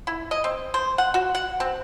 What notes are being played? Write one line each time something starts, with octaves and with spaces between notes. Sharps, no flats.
E4
D#5
C4
C5
F#5
F#4
F#5
C4